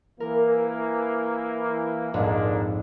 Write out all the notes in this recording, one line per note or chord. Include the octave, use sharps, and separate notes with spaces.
E3 A#3 A#4
A#1 F2 G#2 G#3 A#3 D4